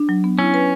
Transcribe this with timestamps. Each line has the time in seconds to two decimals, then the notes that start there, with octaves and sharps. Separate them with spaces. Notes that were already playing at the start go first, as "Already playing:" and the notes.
Already playing: D4
0.09 F#3
0.24 B3
0.39 C#4 E4
0.54 B4